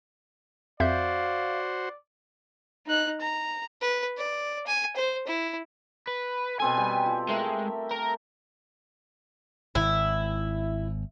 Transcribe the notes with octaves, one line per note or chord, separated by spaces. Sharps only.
F2 F#4 C5 D5 E5 F5 G6
D#4 F#6
A#5
B4
D5
G#5
C5
E4
B4
B2 C4 A4 G#5
G3 G4
F4
G#3 A3 A#4 E5
A#4
G#1 E4